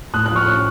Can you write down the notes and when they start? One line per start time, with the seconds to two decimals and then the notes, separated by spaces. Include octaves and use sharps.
0.13 A2 D#6 F#6
0.26 F3 F#6
0.36 C#6 F6
0.47 C#4